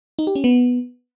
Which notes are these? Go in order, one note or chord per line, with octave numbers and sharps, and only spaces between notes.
D#4
G4
C#4
B3